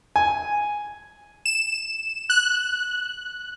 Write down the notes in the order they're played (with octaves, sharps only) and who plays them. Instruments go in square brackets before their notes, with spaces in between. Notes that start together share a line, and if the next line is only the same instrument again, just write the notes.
[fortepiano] G#5
[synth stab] E7
F#6